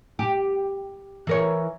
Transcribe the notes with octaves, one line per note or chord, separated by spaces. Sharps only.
G4
E3 A#4 C#5